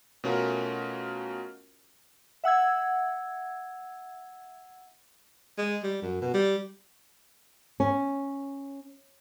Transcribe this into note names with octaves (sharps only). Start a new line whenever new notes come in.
B2 A3 C#4 F4 F#4 A#4
E5 F#5 E6 G#6
G#3
G3
F#2
B2
G3
C#4